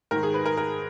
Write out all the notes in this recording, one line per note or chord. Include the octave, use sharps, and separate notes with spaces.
G#2 D#3 A#4
G#4
B4
A#4
A#4